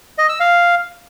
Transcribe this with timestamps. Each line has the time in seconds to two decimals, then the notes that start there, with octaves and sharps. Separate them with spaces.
0.18 D#5
0.29 E6
0.40 F5